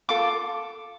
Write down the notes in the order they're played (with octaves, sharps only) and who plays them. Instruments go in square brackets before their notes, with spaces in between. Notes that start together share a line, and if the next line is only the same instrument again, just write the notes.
[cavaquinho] F4 A4 D6